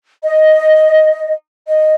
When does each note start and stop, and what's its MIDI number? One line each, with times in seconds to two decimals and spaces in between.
0.23 1.30 75
1.68 1.95 75